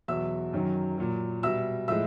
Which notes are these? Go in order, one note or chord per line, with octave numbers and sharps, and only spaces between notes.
E2 B2 F#3 E5 E6
F#2 D#3 F#3
A#2 F#3
B2 G3 E5 E6
A2 F3 G#3 E5 E6